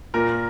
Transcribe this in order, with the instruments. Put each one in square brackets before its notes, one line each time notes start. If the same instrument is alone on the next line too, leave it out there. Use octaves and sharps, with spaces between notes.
[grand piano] A#2 A#4